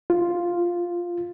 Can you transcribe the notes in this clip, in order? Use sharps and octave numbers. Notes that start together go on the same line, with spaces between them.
F4